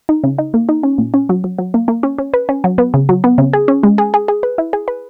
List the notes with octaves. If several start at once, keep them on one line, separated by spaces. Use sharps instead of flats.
D#4
C#3
D#4
A#3
D#4
C#4
A#2
C#4
F#3
F#3
F#3
A#3
A#3
C#4
C#4
B4
C#4
F#3
B3
C#3
F#3
B3
C#3
G#4
C#4
G#3
G#4
G#4
G#4
B4
E4
G#4
B4